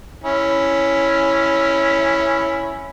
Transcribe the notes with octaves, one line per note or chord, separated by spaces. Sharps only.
C#4 E4